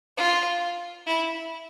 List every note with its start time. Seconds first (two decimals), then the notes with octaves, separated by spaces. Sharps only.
0.17 F4
1.07 E4